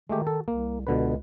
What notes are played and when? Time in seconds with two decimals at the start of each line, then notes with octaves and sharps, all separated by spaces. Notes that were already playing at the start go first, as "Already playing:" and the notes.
0.09 D#3 G#3 A3 G4
0.27 A4
0.48 C2 A#3
0.87 C#2 B2 D3 B4